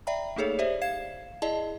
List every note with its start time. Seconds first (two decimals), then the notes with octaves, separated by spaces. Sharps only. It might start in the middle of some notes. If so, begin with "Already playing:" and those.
0.07 D5 E5 G5 A#5 B5
0.36 A3 A#3 D#4 G#4 A4 C#5
0.59 G4 C5 D5 E5
0.82 F5 G#6 C7 E7
1.42 E4 G#4 D5 D#5 A5